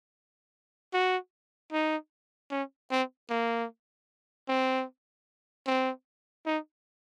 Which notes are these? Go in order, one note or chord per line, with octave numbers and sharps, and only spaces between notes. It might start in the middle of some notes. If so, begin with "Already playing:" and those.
F#4
D#4
C#4
C4
A#3
C4
C4
D#4